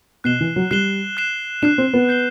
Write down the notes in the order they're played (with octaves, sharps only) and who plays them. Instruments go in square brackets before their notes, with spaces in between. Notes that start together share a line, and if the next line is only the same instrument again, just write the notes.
[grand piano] B2 [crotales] F#6 C7 E7 G7
[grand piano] E3
F#3
[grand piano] G3 [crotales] F#6 C7 E7 G7
[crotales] F#6 C7 E7
[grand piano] D4 [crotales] F#6 C7 E7
[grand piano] C4
B3
[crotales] G6 C7 G7